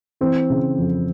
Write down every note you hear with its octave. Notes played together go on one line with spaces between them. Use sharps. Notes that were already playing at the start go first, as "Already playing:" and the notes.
E3 C4
C#3
F2